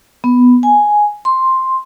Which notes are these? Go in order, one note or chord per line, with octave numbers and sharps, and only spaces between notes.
B3
G#5
C6